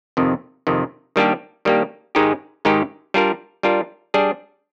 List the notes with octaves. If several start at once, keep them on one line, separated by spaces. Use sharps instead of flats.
F2 C3 D#3
F2 C3 D#3
D#3 G3 A#3 D4 G4
D#3 G3 A#3 D4 G4
G#2 D#3 G#3 D#4 G4
G#2 D#3 G#3 D#4 G4
G3 D4 F4 A#4
G3 D4 F4 A#4
G3 D4 G#4